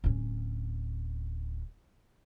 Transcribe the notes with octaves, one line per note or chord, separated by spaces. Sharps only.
D1 C#4